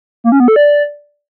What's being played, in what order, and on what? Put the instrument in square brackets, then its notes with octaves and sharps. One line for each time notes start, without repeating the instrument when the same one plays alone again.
[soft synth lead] A#3
C#4
B3
A4
D5